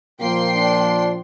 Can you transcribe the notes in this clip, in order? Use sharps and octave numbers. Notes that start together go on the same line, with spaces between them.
A#2 F3 A#3 G5 C6 C7
D4